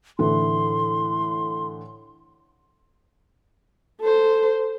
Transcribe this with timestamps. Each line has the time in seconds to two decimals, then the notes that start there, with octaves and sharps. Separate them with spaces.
0.19 A2 D3 E3 C6
4.00 A4 C5